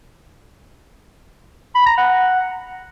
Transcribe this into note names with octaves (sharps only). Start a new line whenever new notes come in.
B5
A#5
F#5